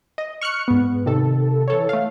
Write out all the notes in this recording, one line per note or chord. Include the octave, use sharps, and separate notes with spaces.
D#5
C#6 F6 F#6 C#7
G#2 B3
C3 D#3 A4
E3 A4 C#5
A3 F5